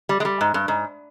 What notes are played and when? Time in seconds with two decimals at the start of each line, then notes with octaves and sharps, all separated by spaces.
0.09 G3
0.20 G#3
0.25 G3
0.41 G#2
0.54 G2
0.68 G#2